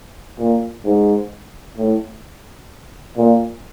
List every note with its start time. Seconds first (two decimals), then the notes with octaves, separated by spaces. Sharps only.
0.39 A#2
0.85 G#2
1.77 A2
3.17 A#2